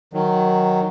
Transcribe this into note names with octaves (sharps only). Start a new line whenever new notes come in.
D#3 F#3